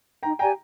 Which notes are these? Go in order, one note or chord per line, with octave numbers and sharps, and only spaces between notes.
D#4 G5 A#5
G4 D5 G5 G#5 A#5